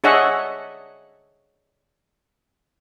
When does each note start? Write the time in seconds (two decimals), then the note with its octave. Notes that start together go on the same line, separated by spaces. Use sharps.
0.04 D4 G#4 C#5 D#5 E5 F#5